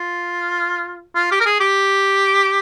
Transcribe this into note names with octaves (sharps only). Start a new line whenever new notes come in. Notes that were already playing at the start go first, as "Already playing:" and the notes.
Already playing: F4
F4
G4
A#4
G#4
G4